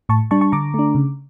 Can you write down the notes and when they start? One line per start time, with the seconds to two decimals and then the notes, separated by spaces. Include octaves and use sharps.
0.09 A2 A5 C#6
0.31 G3 D4 A5 C#6
0.41 A5 C#6
0.52 D3 A#5 D6
0.74 A3 D4
0.95 C#3